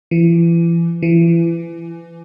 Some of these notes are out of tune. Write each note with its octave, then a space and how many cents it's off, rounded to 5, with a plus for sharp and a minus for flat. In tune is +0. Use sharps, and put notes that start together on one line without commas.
E3 +35
E3 +30